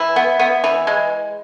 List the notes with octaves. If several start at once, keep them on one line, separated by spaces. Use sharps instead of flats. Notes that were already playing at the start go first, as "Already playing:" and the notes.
Already playing: E3 E4
B3
B3
E3
G#3